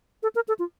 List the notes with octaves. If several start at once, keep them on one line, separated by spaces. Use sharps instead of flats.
A4
A#4
A4
F4